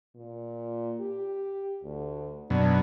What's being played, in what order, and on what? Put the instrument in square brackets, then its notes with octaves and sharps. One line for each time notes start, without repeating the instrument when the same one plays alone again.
[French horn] A#2
G4
D2
[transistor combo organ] F#2 B2 [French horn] D4